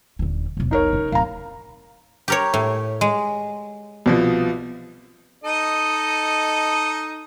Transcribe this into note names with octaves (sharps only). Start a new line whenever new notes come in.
D#1 D3
E1 B1
D#4 A#4 C#5
C#3
D1 F5 A#5
G4 A#4 C#5
A2
G#3
C2 B2 F3
D#4 A4 D#5